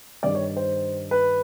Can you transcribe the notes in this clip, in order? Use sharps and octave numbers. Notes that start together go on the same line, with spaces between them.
G2 D#3 G3 D5
C#5
C5
B4